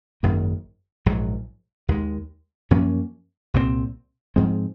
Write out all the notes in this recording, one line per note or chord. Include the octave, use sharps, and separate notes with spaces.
G#1 F#2 D#3 A#3
A#1 G#2 F#3
D#2 D#3 G#3
F#2 F3 A#3 C#4
C2 A#2 G#3 C4
G#2 F3 G#3 C4